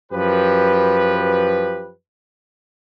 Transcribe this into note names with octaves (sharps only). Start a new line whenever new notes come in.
F#2 F3 G4 B4